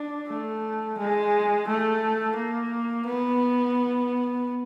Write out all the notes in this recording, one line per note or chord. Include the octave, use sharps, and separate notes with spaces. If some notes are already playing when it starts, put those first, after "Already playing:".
Already playing: D4
A3
G#3
A3
A#3
B3